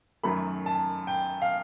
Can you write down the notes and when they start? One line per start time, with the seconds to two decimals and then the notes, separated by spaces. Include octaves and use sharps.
0.23 F#2 D#3 F#3 A3 B5
0.66 A5
1.07 G5
1.42 F5